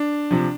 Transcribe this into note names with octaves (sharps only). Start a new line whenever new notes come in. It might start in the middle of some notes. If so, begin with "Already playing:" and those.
Already playing: D4
C3 F3